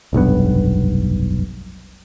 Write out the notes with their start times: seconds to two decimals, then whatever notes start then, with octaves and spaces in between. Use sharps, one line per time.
0.13 F1 B1 G2 B3